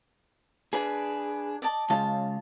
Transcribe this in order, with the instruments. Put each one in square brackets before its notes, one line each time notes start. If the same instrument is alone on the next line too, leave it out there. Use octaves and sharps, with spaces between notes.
[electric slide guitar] D4 G#4 [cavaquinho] B4
[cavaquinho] D5 D#5 A5
[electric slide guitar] C#3 G#3 F4 [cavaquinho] A5